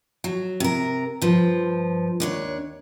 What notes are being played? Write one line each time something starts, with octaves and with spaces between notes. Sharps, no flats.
F#3
C3 A#4
G2 F3
D#2 D4 C#5